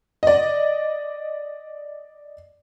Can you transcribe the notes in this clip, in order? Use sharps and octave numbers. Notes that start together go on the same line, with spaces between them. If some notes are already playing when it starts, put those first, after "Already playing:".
D5 D#5